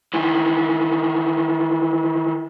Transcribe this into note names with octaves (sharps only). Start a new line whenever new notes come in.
D#3 E3